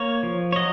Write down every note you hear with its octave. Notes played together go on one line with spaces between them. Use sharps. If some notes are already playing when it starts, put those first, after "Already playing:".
Already playing: A#3 C#5
F3
C#5
F#3 D#5